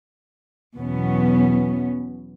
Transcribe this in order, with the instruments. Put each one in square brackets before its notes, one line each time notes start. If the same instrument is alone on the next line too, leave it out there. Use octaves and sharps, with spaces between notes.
[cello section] E2 B2 F#3 B3 C#4